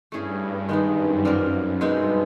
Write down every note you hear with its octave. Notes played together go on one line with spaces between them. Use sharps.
G2 A3 C#4 E4 G#4
D#3 G#3 B3 D#4
F#2
G3 C4 F4 A#4
G2 B2 G#3 C4 D#4